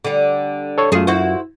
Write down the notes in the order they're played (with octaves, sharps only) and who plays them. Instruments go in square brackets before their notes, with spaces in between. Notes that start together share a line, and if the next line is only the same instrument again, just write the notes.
[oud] D3 G3
[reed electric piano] A4 C#5 C#6
[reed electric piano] F#2 F4 [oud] A3 G#4
[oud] E4 F#4 C5